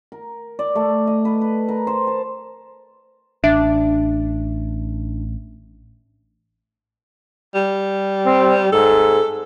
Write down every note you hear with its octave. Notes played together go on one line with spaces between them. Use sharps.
A#4
D5
A3
D#5
B4
B4
A#4
C5
A5
A1 D4 E5
G3
C4
G#2 A4